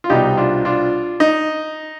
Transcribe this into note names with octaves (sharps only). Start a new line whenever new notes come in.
F4
C2 B2 G3 D#4 G4
D4 F4
D4 F4
D#4